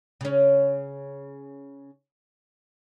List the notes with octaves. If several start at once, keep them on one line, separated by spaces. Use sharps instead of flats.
C#3 C#4